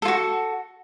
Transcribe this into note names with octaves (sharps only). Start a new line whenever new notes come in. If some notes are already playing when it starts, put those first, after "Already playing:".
F4 F#4 A4